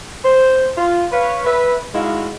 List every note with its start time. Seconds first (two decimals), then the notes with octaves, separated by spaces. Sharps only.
0.24 C5
0.78 F4
1.12 B4 C#5 F5
1.45 B4 E5
1.94 G#3 D#4 E4 F#4 F5